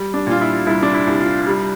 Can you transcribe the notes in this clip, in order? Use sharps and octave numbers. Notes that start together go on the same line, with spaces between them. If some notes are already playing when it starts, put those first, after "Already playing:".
Already playing: G3
D4
A#2 F4
E4
C2 E4
D4
E4
C2
F4
G3